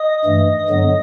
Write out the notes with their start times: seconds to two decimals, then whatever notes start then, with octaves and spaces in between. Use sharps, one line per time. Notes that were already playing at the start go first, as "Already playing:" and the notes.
Already playing: D#5 D#6
0.25 G2 E3 A3
0.68 G2 D3 F#3 B3